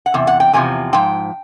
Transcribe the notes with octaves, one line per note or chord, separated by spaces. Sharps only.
F#5
E2 C3
F#5
G5
E2 C3 F3 G#5
G#2 F3 G5